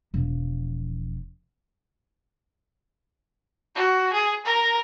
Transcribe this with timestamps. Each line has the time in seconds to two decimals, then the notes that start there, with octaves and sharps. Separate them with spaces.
0.14 E1 F3
3.75 F#4
4.13 G#4
4.45 A#4